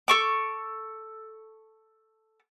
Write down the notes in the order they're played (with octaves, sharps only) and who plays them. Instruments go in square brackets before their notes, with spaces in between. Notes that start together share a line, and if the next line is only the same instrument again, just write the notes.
[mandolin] A4 C#6 D6